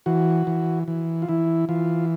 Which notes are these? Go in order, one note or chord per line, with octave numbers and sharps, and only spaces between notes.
E3 F#4
E3
E3
F4
E3 E4
E3 F4